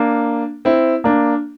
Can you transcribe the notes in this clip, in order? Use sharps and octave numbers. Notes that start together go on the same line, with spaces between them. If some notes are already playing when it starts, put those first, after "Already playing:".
Already playing: A#3 D4
C4 E4
A#3 D4